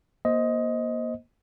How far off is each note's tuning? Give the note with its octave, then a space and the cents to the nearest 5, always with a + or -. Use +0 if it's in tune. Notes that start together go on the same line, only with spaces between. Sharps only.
A#3 +30 C5 +0 D#5 +15